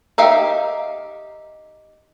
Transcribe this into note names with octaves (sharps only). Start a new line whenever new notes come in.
D#4 G4 A#4 E5 F5